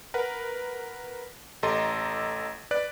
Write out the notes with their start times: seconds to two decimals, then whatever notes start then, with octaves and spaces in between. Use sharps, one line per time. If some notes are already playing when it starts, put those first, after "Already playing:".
0.14 A#4 B4 F#5
1.63 A1 G4 A4 D#5 A#5 C6
2.71 B4 D5 F#6